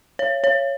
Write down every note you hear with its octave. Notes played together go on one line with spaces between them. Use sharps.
C#5
C#5